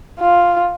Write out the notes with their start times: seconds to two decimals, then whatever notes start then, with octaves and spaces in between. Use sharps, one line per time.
0.20 F4